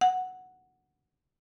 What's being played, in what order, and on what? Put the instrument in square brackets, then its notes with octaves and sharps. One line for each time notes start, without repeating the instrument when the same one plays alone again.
[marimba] F#5